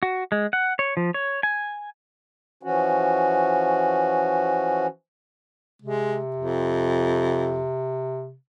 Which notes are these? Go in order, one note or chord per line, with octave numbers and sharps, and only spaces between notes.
F#4
G#3
F#5
C#5
F3
C#5
G#5
E3 F3 C#4 F#4
C3 G#3
F2